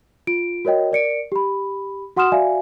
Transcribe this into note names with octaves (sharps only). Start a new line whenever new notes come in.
F4 D7
F#4 A#4 C#5 D#5 G5
A#4 D5 C#7 D7
G4 B5
F#4 F#5 C6 D#6 F6 E7
F#4 D5 E5 F5 G#5